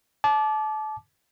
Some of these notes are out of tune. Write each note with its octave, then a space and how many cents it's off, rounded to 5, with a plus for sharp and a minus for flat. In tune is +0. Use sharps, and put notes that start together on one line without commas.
A5 -30 D6 +0